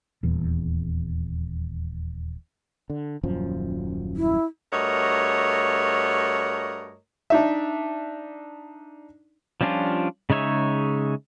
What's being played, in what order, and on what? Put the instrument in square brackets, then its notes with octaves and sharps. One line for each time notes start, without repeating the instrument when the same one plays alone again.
[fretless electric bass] D#1 E2
D3
D#1 F#2 F3
[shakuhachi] E4
[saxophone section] G2 A3 F#4 A#4 C#5 D#5
[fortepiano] D4 D#4 E5
[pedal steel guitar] F3 G3 C#4 D4 F4
C#3 G#3 D#4 C#5 E5